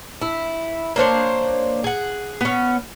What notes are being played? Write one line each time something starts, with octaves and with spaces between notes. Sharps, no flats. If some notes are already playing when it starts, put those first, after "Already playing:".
E4
A#3 D4 C5 C#5
G#4 F#5
B3 C#4